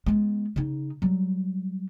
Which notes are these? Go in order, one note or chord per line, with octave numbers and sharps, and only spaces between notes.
G#3 B3
C#3 D#4
F#3 G3